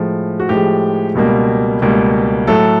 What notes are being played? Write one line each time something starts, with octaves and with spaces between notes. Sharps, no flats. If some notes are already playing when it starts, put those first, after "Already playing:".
Already playing: A2 F3 G#3
F#4
A2 F3 G#3 G4
C#2 B2 G3 A#3
C#2 B2 G3 A#3
A2 F#3 A3 A4